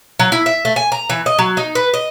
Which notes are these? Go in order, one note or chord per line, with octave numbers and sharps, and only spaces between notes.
F#3
E4
E5
A3
G#5
A#5
E3
D#5
F#3
D#4
B4
D#5